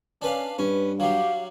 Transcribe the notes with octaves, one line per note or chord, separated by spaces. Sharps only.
C#4 D4 B4 F5
G2 C#4 B4
F#3 G3 G4 F5